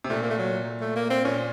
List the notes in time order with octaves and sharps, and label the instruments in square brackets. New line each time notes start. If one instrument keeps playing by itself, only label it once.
[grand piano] C3
[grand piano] A#2 [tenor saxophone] A3
[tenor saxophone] A#3
A3
F#3
A3
A#3
C4
[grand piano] A#2 [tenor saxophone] C#4